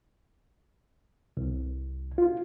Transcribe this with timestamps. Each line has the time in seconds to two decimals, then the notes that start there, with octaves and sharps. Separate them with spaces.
1.37 C2
2.18 F4